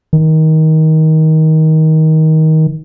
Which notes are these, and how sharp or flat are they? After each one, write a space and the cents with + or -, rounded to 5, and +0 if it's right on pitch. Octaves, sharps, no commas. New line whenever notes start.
D#3 +20